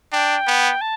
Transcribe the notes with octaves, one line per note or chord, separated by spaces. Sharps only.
D4 G5
B3
A5